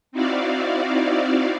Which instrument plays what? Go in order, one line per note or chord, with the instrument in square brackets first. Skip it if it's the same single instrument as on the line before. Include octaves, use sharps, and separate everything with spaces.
[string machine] C4 D#4 E4 F#4 D5 F5